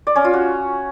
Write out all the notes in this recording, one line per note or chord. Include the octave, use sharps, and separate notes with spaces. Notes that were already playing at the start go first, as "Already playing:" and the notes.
D5
C#4
F4
F#4